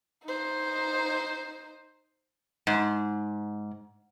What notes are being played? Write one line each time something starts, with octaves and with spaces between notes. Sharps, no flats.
D#4 C5
G#2